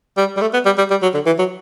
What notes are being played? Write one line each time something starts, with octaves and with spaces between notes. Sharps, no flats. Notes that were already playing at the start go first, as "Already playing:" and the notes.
G3
G3
A3
B3
G3
G3
G3
F#3
D3
E3
F#3